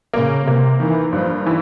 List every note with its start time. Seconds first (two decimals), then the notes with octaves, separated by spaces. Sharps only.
0.13 C#3 A#3
0.47 C3 A#3
0.80 D#3 E3
1.13 G2 F3
1.46 E3